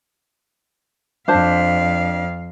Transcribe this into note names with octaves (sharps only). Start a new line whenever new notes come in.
F2 D4 C5 F5 A5